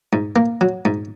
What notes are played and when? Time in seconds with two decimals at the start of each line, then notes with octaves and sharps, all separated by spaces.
0.13 G#2
0.36 A#3
0.61 F#3
0.85 G#2